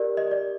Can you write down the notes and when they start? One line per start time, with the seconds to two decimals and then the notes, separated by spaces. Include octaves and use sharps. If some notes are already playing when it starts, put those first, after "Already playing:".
Already playing: G4 A#4 D5
0.17 D#5
0.31 D5